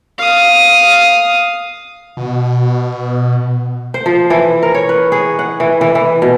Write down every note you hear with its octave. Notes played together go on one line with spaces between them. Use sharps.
F5 D#6
B2
C5
F3
E3
A#4
C#5
B4
G#4
F#5
E3
E3
E3
B2